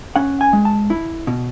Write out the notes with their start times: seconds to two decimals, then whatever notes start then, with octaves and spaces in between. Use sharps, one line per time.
0.16 C#4 F#5
0.41 G#5
0.53 G#3
0.65 A5
0.90 E4
1.27 B2